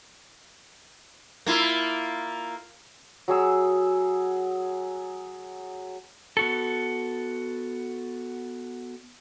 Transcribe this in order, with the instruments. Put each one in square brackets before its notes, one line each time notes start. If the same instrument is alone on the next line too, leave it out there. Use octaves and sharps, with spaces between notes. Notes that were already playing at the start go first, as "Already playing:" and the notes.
[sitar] A#3 E4 F4
[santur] F#3 G#4 E6
[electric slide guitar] B3 F#4 A4